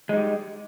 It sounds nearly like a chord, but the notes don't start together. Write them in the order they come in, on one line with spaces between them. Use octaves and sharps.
G#3 D#4 G3